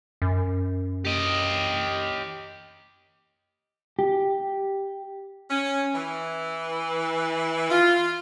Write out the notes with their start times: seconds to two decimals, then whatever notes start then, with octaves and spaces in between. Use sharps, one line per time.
0.22 F#2
1.05 G4 D#5
3.99 G4
5.50 C#4
5.95 E3
7.70 F4